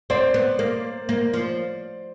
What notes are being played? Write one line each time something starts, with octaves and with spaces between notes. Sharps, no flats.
C4 C5 D5
B3
A#3
A#3
F3